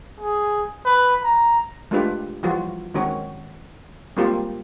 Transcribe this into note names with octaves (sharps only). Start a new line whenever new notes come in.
G#4
B4
A#5
G#3 A3 D4 F4 G4 B4
E3 F3 G3 F4 F#4
D#3 G#3 C4 C#4 F#4 C#5
G3 G#3 A#3 C4 F4 G4